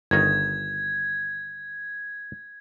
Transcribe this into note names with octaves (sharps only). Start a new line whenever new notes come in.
G1 D#3 D#4 G#6